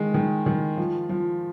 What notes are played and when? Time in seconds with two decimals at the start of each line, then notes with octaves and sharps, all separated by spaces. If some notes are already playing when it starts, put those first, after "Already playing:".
Already playing: D#3 G#3
0.14 D#3
0.46 D#3
0.77 F3
1.09 F3